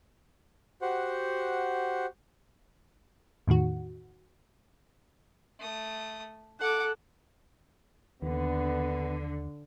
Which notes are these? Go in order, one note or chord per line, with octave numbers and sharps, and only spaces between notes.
F#4 G4 C5 F#5
E2 A2 D#3 F#4
A3 D#6
A4 F#5 D6 F#6
D#2 D3 B3